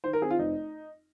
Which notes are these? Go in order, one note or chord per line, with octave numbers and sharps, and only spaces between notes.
D#3 C5
A#4
C4 G#4
F4
F1 D#4